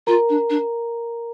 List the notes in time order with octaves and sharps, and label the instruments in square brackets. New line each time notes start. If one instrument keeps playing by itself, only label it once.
[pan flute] F4 [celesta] A#4 A#5
[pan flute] D4
D4